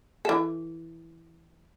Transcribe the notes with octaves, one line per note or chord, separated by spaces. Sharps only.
E3 A4